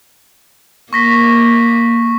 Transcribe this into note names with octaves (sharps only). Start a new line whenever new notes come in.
A#3 C#6 A#6 B6